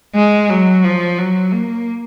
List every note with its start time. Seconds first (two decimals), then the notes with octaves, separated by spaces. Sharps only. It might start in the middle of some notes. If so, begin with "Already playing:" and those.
0.15 G#3
0.50 F#3
0.84 F3
1.18 F#3
1.52 A#3